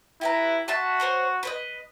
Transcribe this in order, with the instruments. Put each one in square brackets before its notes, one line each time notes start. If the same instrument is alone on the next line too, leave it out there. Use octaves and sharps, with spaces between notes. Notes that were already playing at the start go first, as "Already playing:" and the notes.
[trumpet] E4 [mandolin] G4 B4 A#5
[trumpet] F#4 [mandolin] E5 A5 C6
[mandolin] C5 C#5 C6
B4 C5 D#5